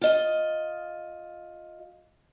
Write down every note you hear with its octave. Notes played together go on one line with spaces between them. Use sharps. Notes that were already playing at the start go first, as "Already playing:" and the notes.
F4 D#5